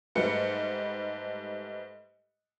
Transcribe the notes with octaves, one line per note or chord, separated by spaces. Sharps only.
G#2 G3 A3 B4 C#7